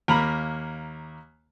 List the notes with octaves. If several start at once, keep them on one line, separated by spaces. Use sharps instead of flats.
D#2 A#3 A#5 B5